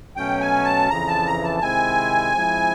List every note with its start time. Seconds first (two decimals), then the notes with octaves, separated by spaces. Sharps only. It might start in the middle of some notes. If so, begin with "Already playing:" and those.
0.16 B2 F#3 A3 C#4 G5
0.41 G#5
0.65 A5
0.90 F2 C#3 E3 A#5
1.08 A5
1.26 A#5
1.44 A5
1.62 C3 D#3 G#3 C4 E4 G#5
2.35 F3 G#3 C4 E4